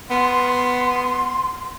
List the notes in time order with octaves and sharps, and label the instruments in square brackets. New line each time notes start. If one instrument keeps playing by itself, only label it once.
[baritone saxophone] B3 [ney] C6